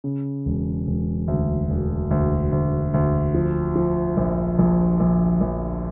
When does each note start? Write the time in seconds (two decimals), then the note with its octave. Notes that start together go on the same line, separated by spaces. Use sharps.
0.04 C#3
0.46 E1
0.87 E1
1.28 D2
1.70 E1
2.11 D2
2.52 D2
2.94 D2
3.34 F3
3.76 F3
4.17 A#1
4.59 A#1
5.00 A#1
5.41 A#1